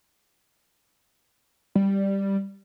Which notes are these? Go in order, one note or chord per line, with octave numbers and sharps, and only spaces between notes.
G3